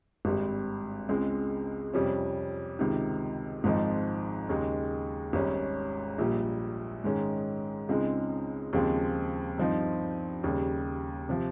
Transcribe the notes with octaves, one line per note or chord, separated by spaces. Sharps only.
G#1 G2 G3 C4
C#2 C#3 G#3 C4
F2 C3 G3 C#4
C#2 C3 D#3
G#1 G#2 F3 C4 D#4
D#2 C#3 G#3 D#4
G#1 G#2 G3 C#4
A#1 A#2 G3
G#2 D#3 G#3 C#4
C#2 C#3 G#3 C4 D#4
D#2 C#3 F3 G#3 C4
G2 F3 C4 D#4
D#2 C#3 G3
C3 F3